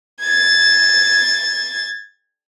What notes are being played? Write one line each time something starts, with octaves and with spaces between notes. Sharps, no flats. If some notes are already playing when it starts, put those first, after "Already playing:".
G#6 A6